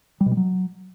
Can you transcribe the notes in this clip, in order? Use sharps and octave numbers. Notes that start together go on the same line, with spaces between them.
G3
B2
G3
F#3